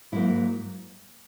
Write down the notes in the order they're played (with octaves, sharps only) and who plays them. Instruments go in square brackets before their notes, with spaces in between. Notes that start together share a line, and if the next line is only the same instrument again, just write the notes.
[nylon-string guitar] G#2 F#3 A#3 E4